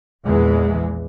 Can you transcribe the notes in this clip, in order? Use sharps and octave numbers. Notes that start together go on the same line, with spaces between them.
A#1 E2 E3 G#3